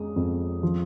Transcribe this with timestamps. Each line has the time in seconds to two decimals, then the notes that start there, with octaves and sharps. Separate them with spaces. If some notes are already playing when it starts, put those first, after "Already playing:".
Already playing: F2 G#3 D#6
0.16 F2
0.63 F3